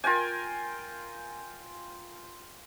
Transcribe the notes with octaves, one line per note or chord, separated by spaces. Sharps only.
F4 A#4 G5 G#5